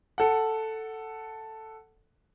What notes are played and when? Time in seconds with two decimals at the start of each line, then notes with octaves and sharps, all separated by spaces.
0.18 A4 F#5